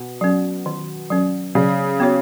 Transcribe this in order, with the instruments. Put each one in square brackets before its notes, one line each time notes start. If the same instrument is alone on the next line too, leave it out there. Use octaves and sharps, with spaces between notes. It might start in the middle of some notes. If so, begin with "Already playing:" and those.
Already playing: [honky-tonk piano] B2
[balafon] F#3 C#4
D#3
F#3 C#4
[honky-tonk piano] C#3 [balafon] F#3
[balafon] B3 F#4 C#5